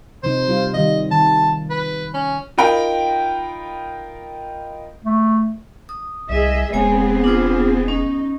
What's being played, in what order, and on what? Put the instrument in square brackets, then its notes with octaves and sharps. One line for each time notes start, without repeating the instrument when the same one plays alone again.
[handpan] C3 F3 D#4 [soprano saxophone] C5
[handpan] G3 F4
[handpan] D#3 F3 G3 [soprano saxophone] D#5
[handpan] D#3 [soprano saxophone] A5
[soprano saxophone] B4
C#4
[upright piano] D#4 F4 A#4 G5 B5
[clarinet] A3
[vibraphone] D#6
[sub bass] C2 [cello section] G#4 D#5 E5
[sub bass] E1 [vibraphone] G#3 C#5 G#5 [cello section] B3 C4 G#4
[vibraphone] D4 F4 C5
[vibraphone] C#4 [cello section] D#4